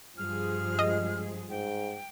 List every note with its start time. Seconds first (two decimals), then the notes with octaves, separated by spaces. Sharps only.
0.18 G2 F3 G#4 F6
0.79 G#3 D#5
1.50 G#2 G5